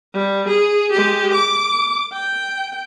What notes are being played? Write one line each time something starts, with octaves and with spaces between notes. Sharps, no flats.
G3
G#4
G#3 G4
D6
G5